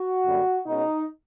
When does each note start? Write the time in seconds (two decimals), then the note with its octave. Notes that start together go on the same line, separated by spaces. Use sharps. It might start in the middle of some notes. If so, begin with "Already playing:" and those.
Already playing: F#4
0.25 F#2 D3 G3 A#3
0.67 B2 G#3 C#4 D#4